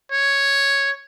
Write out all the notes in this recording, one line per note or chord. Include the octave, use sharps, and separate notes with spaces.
C#5